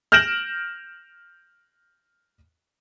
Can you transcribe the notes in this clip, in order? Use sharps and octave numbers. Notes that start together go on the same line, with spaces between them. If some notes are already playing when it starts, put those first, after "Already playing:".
F6 G6 A#6 D7 E7 F#7